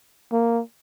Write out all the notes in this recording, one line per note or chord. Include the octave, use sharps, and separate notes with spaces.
A#3